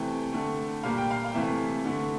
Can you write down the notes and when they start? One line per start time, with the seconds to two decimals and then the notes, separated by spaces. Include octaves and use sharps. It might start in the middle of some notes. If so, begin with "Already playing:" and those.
Already playing: C3 E3 A3 G5
0.33 D3 A3
0.83 A#2 G3 A#3 F5
0.97 G5
1.11 F5
1.25 F5
1.34 C3 E3 A3 E5
1.84 D3 A3